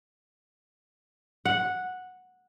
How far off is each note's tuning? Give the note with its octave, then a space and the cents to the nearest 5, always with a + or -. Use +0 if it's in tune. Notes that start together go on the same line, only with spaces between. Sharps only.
F#5 -10